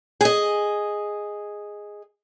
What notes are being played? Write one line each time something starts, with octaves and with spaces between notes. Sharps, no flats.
G#4 D#5